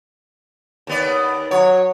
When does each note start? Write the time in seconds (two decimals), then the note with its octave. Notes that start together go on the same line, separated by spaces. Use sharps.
0.87 D#2 B3 D5
1.51 F#3 C#5